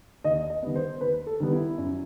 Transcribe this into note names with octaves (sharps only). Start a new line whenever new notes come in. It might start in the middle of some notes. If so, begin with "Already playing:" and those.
D#2 D#5
D#5
D#3 G3 B3
C5
D#2 B4
A4
D#3 G3 B3
E4
F#2